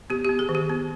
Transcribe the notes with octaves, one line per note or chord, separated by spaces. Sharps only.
B3 G4
B3 G4
G#4
D#3
G4
B3